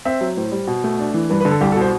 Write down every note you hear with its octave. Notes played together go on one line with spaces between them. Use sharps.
C4 E5
F#3
A2 C5
G3
B2
A3
D4
E3
G2 B4
B4
D3
A4
C2 G4
A4
B2
C5